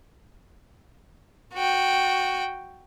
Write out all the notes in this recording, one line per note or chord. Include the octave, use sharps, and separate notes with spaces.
F#4 G5